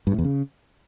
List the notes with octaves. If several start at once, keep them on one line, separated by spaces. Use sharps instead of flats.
G2
A2
E2
C#3